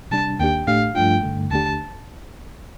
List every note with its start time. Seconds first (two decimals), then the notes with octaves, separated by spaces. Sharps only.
0.11 C3 G3 D4 A5
0.39 D#2 D#3 A#3 D4 G4 G5
0.67 A2 A3 D4 G4 F5
0.95 G2 F3 A3 D4 F4 G5
1.23 G2 D3 A3
1.51 D#2 D3 A3 D4 G4 A5